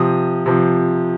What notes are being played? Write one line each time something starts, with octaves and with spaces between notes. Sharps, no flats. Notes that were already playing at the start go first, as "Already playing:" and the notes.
Already playing: C3 F3 D#6
C3 F3